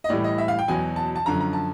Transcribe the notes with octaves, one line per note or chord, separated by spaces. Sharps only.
D#5
A2 E3 G3 D5
D#5
E5
F5
G5
E2 B2 F#3 G#5
A5
A5
F#2 D3 F3 A#5
A#5
A5